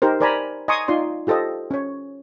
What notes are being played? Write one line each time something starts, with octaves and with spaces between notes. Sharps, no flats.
D#4 G4 A#4 C5
A#4 C5 D5 G#5 A#5 B5
D#5 G#5 A#5 C6 C#6 D#6
D#4 F4 D5 C6
F4 G4 A4 C5 D#5
C#4 C#5